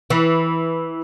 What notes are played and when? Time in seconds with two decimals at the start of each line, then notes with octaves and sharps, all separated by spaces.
0.10 E3